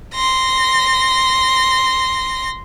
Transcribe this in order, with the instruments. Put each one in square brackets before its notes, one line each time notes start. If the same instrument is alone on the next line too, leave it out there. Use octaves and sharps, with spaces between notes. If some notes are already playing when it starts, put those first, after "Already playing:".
[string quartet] C6 A#6